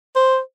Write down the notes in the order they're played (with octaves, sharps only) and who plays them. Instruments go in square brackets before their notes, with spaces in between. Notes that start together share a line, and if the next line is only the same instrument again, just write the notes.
[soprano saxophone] C5